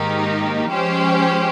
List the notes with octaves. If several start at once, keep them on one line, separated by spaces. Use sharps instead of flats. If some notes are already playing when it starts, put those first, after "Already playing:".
Already playing: G#2 D#3 A#3 D#4 G4
F3 G#3 C#4 G4 C5